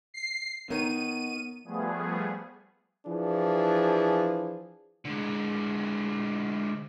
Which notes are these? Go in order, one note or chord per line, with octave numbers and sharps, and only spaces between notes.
C7
D#3 B3 A#4 C#5 D#7
F3 G3 A3 B3 G#4
E3 F3 D4 G#4
D3 G#3